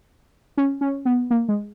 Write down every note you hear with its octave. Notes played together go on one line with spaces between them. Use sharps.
C#4
C#4
B3
A#3
G#3